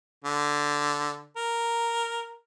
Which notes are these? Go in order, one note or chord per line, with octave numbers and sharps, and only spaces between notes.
D3
A#4